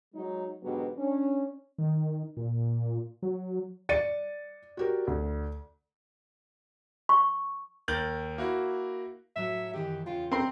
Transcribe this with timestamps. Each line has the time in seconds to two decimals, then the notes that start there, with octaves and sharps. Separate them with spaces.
0.15 F#3 G#3 D#4
0.63 G#2 B2 D3 F#3 B3 G4
0.96 C#4 D4
1.78 D#3
2.37 A#2
3.23 F#3
3.89 D5 A6 C#7 D#7
4.77 F#4 G4 A#4
5.07 D2
7.09 C#6
7.88 D#2 A#4 G6 A6 F#7
8.38 A#3 E4 F#4
9.36 A2 F#3 E5
9.73 F#2 D#3 E3 G4
10.06 E2 C#3 F4 G5
10.32 C4 A#4 C6